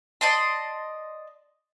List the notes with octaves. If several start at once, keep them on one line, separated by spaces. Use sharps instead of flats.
D5 D#5 A5 C6